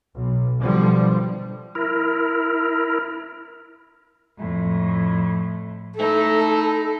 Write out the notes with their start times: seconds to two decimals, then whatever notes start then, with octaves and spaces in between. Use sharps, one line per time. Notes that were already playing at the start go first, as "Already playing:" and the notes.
0.15 B1
0.60 B2 D3 F3 G3
1.75 E4 A#4
4.37 F2 A2
5.95 A3 D#4 E4 A4